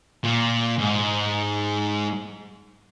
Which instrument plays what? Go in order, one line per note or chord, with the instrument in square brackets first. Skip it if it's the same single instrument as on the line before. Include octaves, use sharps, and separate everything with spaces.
[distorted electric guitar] A#2
G#2